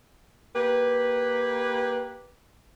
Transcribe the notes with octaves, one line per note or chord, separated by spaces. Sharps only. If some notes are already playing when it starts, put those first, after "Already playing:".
A#3 G4 B4